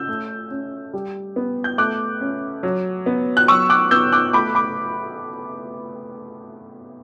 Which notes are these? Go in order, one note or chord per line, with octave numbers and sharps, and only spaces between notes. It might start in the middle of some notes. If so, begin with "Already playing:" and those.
Already playing: C#4 E6 G6
A3
C#4
G3
B3
G6
A3 D6 F#6
C#4
F#3
B3
F#6
F#3 C#6 E6
D6 F#6
B3 E6 G6
D6 F#6
A3 B5 D6
B5 D6